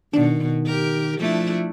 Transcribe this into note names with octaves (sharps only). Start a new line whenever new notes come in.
B2 D#3 D4
G4 A#4
F3 A3 D4 E4